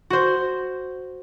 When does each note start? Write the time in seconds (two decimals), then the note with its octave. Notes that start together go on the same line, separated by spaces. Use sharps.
0.10 F#4 C5